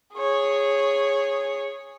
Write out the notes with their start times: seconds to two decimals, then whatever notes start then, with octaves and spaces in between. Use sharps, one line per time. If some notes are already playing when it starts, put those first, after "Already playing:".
0.14 G#4 C#5